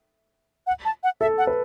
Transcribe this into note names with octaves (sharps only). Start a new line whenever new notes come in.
F#5
A5
F#5
A4 E5
F#5
B4